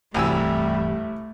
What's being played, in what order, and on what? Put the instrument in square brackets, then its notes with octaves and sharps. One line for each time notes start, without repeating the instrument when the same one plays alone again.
[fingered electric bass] D1 G2 E3 [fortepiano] C2 G#5 E6 [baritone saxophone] G3 [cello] A3